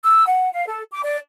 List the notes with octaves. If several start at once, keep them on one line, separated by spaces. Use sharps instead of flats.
E6
F#5
F5
A4
D6
D5